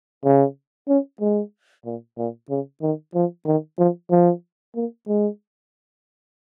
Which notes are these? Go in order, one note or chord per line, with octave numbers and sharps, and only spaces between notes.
C#3
C#4
G#3
A#2
A#2
C#3
D#3
F3
D#3
F3
F3
A#3
G#3